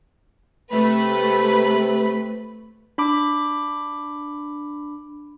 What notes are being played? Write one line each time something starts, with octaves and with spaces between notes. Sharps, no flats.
C3 A3 B4 B5
D4 B5 D6